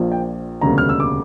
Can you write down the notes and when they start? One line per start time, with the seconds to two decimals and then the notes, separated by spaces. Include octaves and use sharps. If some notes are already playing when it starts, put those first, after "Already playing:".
Already playing: A#1 A#2 F3
0.12 G5
0.61 E1 D2 C#3 G3 A#3 A#5
0.78 F6
0.89 E6
1.00 D6